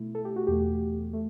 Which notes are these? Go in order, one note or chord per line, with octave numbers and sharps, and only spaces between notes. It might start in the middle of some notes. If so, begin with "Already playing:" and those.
Already playing: B2 A3 E4
A4
G4
F#4
E2 B2 A3 G4
A3